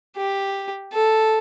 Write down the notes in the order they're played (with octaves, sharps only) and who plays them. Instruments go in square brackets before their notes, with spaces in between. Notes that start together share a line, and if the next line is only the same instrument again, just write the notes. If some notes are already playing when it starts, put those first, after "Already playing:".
[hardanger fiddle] G4
A4